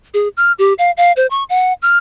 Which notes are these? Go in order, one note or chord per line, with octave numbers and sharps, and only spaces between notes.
G#4
F6
G4
F5
F5
C5
C#6
F#5
F6